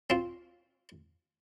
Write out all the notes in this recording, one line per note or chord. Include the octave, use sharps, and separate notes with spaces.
C4 F4